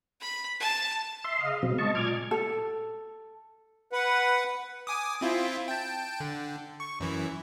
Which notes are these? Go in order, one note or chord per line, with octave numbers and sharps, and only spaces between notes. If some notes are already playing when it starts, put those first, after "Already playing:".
B5
A5
E5 C6
C#3 D#5 F5
B2 F#3 C4
G#3 D#5 A5 C#6
A#2 D6 F6 G#6
A4
B4 F#5
G#5 D6 D#6
C4 E4 F4
G5 A5
D3
C#6
F#2 E3